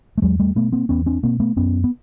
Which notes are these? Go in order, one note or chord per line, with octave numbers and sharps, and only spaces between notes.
A3
E2 F#3 G#3
G3 A3
B2 A3 B3
A#3 C4
E2 B3 C#4
C4 D4
B2 A#3 C4
A3 B3
F#2 B3 C#4
B3